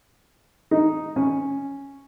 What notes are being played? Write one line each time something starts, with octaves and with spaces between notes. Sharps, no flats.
D#4
C#4